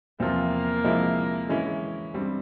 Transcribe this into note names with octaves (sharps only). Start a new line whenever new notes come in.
E2 C3 F3 A#3 C4 F4
C3 F3 G#3 E4
E3 G#3 C#4 E4
G2 G3 C4